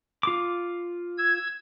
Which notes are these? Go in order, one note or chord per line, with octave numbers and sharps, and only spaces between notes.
F4 D6
E6 G#6